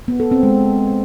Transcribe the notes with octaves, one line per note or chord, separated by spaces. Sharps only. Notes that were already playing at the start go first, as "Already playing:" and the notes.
B3
A4
C4
G#3